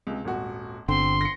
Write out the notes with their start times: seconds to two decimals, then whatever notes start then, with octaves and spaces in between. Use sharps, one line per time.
0.07 C#2 C3
0.25 D#1 G#1 F#4
0.88 G1 D3 C4 C6
1.21 A#6 C#7